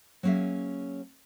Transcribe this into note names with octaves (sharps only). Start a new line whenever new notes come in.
F#3 A#3 C#4 G#4 E5